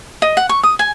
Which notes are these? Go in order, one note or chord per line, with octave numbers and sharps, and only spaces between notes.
D#5
F#5
C#6
D#6
G#5